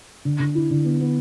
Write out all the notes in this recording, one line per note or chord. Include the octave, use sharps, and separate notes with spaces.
D3
D3
E4
D3
B3
B3